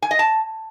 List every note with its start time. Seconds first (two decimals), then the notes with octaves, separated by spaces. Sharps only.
0.02 G#5
0.11 D#5
0.19 A5